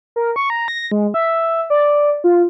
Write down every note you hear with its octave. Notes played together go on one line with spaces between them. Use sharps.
A#4
C#6
A#5
A#6
G#3
E5
D5
F4